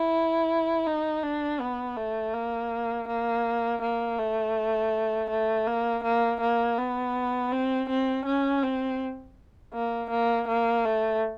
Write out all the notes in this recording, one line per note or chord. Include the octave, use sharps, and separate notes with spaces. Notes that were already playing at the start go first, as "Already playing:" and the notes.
Already playing: E4
D#4
D4
B3
A3
A#3
A#3
A#3
A3
A3
A#3
A#3
A#3
B3
C4
C4
C#4
C4
A#3
A#3
A#3
A3